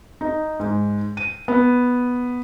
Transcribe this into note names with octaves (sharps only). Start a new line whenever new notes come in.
D#4
G#2
D#7
B3